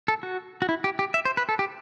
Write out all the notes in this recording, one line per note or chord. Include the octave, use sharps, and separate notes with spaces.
A4
F#4
F#4
E4
G4
G4
E5
C5
B4
A4
G4